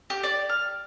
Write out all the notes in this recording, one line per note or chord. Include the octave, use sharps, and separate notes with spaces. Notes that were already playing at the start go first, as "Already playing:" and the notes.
G4
D5
F6